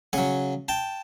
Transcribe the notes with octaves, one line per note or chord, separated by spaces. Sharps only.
C#3 F#3 F#5 G#5
G5 A5